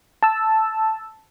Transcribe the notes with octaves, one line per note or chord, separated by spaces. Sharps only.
A5 E6